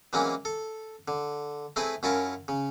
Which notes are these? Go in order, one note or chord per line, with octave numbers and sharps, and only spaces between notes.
E3 F#3 G#3 A#3 C4 C#4
A4
D3
A3 C4 E4 G#4 B4
F#2 C#4 E4 F4 A#4 A5
C#3